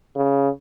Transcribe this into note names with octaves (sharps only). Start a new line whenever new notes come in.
C#3